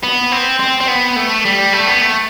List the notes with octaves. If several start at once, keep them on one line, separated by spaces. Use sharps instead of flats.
B3
C4
C4
C4
B3
A3
G3
A3
B3
A3